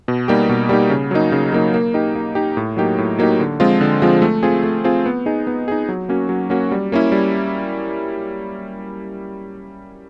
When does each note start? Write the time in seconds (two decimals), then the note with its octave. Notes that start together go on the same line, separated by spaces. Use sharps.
0.08 B2
0.28 G3 A#3 D#4 G4
0.49 B2
0.69 G3 A#3 D#4 G4
0.90 C#3
1.11 F#3 A#3 D#4
1.32 C#3
1.52 F#3 A#3 D#4
1.74 A#3
1.94 D#4 G4
2.15 A#3
2.35 D#4 G4
2.57 A2
2.77 F#3 A#3 D#4 G4
2.98 A2
3.19 F#3 A#3 D#4 G4
3.40 D3
3.60 F3 G#3 C4 F4
3.81 D3
4.02 F3 G#3 C4 F4
4.22 A3
4.43 C4 F4 G#4
4.64 A3
4.84 C4 F4 G#4
5.06 B3
5.26 D#4 G#4
5.47 B3
5.68 D#4 G#4
5.89 F#3
6.09 A#3 C#4 F#4
6.29 F#3
6.50 A#3 C#4 F#4
6.72 G3
6.92 A#3 C#4 E4
7.12 G3